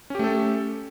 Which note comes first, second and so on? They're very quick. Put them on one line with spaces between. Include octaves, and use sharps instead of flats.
C#4 G4 A3 A4